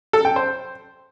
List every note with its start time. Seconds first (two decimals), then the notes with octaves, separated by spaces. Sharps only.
0.13 A4
0.25 G5
0.36 C5